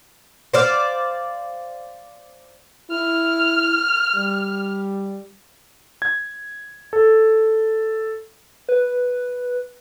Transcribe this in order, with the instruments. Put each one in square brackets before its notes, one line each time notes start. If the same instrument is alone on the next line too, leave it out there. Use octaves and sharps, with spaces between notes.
[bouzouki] C5 D5 F5
[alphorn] E4 [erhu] F6
[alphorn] G3
[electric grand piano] G#6
A4
[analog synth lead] B4